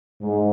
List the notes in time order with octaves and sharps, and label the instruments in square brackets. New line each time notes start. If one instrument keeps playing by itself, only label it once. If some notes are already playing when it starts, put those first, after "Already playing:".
[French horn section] G#2